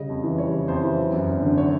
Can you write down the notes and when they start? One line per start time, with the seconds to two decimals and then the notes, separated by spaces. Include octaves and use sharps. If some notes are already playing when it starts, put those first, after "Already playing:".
Already playing: C#3 G3 D#5
0.09 F2
0.24 E3
0.38 G3 C#5
0.53 C#3
0.68 F2 C5
0.84 E3
0.98 F#3
1.13 F#2
1.29 G#1
1.43 D3
1.58 F#3 C#5